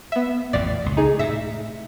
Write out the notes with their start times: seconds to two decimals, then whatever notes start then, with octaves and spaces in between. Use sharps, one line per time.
0.12 B3 E5
0.53 A1 F2 A#2 D5
0.84 C#2 A#2
0.97 D#4 G#4
1.19 A2 C3 E5